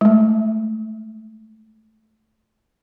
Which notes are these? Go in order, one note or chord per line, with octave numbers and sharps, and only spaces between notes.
G#3 A3